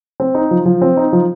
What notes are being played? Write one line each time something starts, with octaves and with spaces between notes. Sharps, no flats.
C4
D#4
F3
F3
C4
D#4
F3